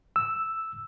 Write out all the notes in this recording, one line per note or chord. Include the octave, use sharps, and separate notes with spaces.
E6